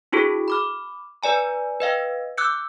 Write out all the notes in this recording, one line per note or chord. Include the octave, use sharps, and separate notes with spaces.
D4 E4 F#4 G#4 A4
B5 D6 F6
B4 D5 G#5 A#5
B4 D#5 F5 G5
D6 E6 F#6 G6 C#7